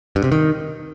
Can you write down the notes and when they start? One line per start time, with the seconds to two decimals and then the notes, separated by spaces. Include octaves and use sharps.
0.16 G2
0.24 C3
0.32 D#3